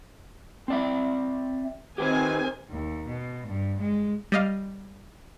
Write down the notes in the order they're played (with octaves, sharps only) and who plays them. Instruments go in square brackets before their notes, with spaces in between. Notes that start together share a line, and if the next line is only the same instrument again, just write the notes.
[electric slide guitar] C4 D5 E5
[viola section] D#3 C4 G#5 [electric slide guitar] G4 B4 C5
[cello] D#2
B2
G2
G#3
[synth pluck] G3 D#5 F5